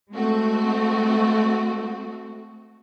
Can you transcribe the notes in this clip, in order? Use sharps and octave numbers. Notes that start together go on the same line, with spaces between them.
G#3 A3 C4 F#4